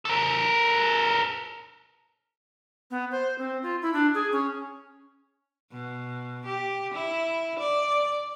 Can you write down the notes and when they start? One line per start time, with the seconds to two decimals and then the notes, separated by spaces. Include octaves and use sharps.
0.05 A4 A#4
2.91 B3
3.11 C5
3.39 C4
3.63 F4
3.82 E4
3.93 D4
4.14 G#4
4.32 C#4
5.72 B2
6.46 G4
6.94 E4
7.60 D5